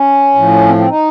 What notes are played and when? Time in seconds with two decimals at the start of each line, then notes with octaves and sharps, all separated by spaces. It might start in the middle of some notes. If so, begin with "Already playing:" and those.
Already playing: C#4
0.35 A2 F3
0.67 C4
0.78 C4
0.89 D#4